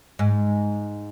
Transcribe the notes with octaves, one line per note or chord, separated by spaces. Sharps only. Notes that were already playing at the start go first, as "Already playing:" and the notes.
G#2